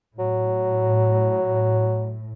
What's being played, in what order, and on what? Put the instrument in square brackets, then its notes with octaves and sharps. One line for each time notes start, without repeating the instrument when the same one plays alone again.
[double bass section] A2 [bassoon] F#3